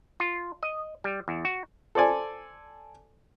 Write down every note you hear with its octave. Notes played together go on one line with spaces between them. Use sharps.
F4
D#5
G3
E2
F#4
A4 C5 D5 G#5